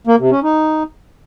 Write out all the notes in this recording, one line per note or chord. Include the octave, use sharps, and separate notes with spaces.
A#3
C3
C#4
D#4